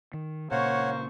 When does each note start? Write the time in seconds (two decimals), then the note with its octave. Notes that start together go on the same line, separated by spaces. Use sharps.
0.14 D#3
0.51 A#2 C#3 A#3 C5 C#5 F#5 C#6